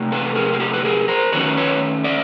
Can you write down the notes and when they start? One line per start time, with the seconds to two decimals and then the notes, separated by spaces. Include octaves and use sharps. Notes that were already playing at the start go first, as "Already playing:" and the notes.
Already playing: C3 A3
0.12 A4 B4
0.35 G#4 A#4
0.53 G#4
0.60 G4 A4
0.74 B4
0.85 G#4 A#4
1.08 A#4 C5
1.33 D#3 F#3 A3 C#4 B4 C#5
1.57 B4 C#5
2.04 D5 E5